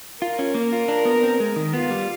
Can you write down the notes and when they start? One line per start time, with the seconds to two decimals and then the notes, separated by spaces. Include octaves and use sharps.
0.21 F4 A#4
0.39 C#4
0.54 A#3
0.72 F4
0.88 D4
1.05 B3
1.23 C4
1.40 G#3
1.56 D#3
1.73 B3 F4
1.90 G3